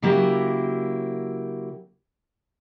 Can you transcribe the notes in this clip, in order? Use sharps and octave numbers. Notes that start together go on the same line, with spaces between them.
C#3 F#3 A#3 E4 G4 A#4